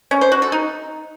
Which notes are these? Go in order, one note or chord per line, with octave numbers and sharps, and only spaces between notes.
C#4
C5
F#4
A4
D#4